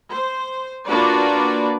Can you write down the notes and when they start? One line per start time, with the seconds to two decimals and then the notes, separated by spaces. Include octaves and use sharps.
0.13 C5
0.86 A#3 D4 F4 F#4 B4 D5